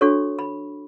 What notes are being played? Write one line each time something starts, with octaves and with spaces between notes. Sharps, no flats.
D4 F#4 A4 C#5 C#6
B5